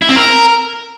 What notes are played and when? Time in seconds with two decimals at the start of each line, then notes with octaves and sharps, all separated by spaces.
0.02 E4
0.09 C4
0.16 A#4